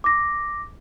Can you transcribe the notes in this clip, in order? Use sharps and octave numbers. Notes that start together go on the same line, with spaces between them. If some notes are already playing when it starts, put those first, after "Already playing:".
D6 A#6